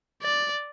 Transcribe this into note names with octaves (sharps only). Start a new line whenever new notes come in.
D5